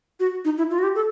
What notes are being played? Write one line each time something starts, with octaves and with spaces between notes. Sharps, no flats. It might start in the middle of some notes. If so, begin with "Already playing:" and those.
F#4
D#4
E4
F4
F#4
G4
A4